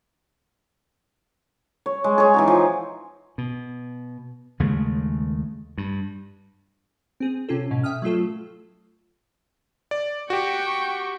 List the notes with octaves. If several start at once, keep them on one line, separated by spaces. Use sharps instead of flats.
C#5
G#3
G#4 C#5
E3 D#4 F#4
F3
B2
D#2 C#3 G#3 A3
G2
C4 G#4
C3 C#4 F4 A4
G#2 B2 C#4
E5 G5 D#6 F6
F#3 A3 F4 A4
D5
F#4 G4 G5 C#6